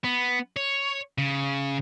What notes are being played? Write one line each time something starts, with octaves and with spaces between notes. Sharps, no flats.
B3
C#5
C#3